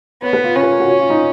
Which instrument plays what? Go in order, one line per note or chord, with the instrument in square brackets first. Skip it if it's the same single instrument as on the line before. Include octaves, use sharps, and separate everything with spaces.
[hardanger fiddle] B3 [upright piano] C#5
[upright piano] B4
F4
[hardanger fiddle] C#4 [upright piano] F4
[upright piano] B4
A#4
F#4
C#5
F4
D#4